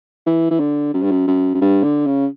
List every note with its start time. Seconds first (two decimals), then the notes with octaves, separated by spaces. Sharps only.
0.26 E3
0.50 E3
0.59 D3
0.94 F#2
1.03 G2
1.11 F#2
1.27 F#2
1.54 F#2
1.61 G2
1.83 D3
2.06 C#3